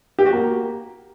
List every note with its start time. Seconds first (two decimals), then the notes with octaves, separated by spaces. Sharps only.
0.19 G4
0.26 F#4
0.33 A#3